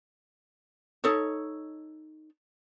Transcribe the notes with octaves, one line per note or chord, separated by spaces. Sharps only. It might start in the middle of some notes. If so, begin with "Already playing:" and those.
D#4 A4 C#5